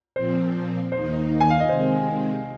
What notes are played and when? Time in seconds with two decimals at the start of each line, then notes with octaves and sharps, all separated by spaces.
0.16 A#2 F3 C4 C5
0.92 D#2 D#3 A#3 D#4 C5
1.40 G#5
1.50 F5
1.60 D#5
1.69 C3 D#3 G#3 C4 C5